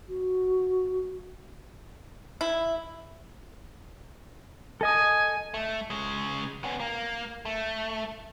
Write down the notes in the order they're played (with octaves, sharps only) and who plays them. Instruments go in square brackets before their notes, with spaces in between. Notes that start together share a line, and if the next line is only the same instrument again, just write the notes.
[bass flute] F#4
[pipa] E4
[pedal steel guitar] A4 D#5 D#6 [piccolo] G#5
[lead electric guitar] A3
C#3 G#3
B3 C#4
A#3
A3